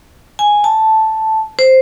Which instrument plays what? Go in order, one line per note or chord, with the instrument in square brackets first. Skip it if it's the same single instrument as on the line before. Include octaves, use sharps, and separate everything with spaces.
[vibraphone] G#5
A5
C5